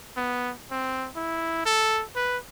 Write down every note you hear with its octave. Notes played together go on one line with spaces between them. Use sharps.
B3
C4
E4
A4
B4